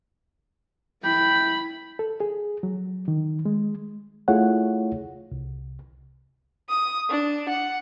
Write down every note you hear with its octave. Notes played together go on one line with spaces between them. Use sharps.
E4 G5 B5
A4
G#4
F#3
D#3
G#3
A3 E4 F4 G#4 C#5 F#5
C2
D#6
D4
F#5